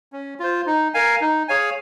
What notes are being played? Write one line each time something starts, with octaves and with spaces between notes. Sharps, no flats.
C#4
F4 C5
D#4
A#4 F5 G#5
D#4
G#4 C#5 F5 G#5